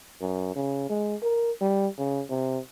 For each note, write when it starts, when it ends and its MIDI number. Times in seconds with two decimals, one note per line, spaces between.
0.21 0.54 42
0.56 0.87 49
0.89 1.16 56
1.22 1.51 70
1.61 1.87 55
1.99 2.23 49
2.30 2.59 48